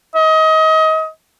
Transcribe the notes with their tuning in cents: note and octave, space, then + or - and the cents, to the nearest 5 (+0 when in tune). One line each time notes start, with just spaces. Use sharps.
D#5 +30